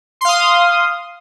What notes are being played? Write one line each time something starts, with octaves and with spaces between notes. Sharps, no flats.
F5 C6 D#6